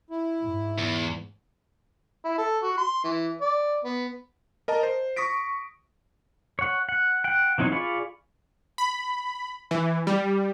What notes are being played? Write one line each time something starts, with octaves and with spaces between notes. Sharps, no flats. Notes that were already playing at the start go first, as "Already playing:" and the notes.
E4
G#2
E2
E4
A4
F#4
C6
E3
D5
B3
A#4 D#5 A5 A#5
C5
C#6 D#6 A#6 B6 D7
C#5 F#5
F#5
F#5 G5
E3 F#3 C4 D#4 C#5
F4 G#4 D5 B5 C#6
B5
E3
G3